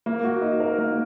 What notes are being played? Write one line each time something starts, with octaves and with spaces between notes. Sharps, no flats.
A#3
F#4
D#4
A#4
A#3